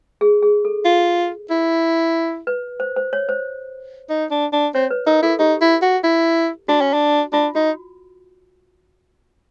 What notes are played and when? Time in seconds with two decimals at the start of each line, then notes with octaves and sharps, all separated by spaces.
0.21 G#4
0.43 G#4
0.65 A4
0.85 F4
1.50 E4
2.47 B4
2.80 C5
2.96 C5
3.13 C#5
3.29 C5
4.10 D#4
4.31 D4
4.53 D4
4.75 C4 C#5
4.90 B4
5.07 D#4 A#4
5.23 E4 A4
5.39 D#4 G4
5.61 E4
5.82 F#4
6.04 E4
6.68 D4 F#4
6.81 C#4
6.94 D4
7.33 D4 F4
7.55 D#4 F#4